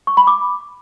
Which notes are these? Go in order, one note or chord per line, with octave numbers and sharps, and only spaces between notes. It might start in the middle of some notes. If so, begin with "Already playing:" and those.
C#6
B5
D6